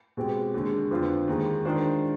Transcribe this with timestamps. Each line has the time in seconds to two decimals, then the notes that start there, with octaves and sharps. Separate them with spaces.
0.17 B2 G#3 C4 G4
0.54 D#2 D3 G#3
0.91 F2 D3 F3 B3 F4
1.27 D#2 D#3 G#3
1.65 D#3 G#3 D4 F4 C5